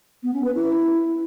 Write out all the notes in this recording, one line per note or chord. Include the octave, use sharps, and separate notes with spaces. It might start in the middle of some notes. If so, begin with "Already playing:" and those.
B3
C#4
B4
E4